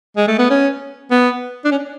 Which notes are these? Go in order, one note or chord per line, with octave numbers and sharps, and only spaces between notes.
G#3
A3
B3
C#4
B3
D4
C#4